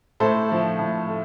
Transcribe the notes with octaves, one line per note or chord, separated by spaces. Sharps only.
A2 A4 C5
F3 A3
A2
A3